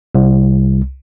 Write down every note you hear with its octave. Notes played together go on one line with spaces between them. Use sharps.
C2